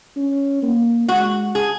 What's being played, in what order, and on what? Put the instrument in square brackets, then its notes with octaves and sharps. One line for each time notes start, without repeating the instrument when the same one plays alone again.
[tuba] C#4
A#3
[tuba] G#3 [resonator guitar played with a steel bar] F#4
[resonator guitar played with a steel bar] G#4